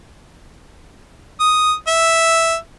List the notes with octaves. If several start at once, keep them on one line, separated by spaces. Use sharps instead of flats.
D#6
E5